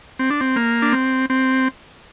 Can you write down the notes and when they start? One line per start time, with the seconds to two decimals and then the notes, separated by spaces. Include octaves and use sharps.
0.19 C4
0.30 D4
0.41 C4
0.56 A#3
0.82 D4
0.93 C4
1.30 C4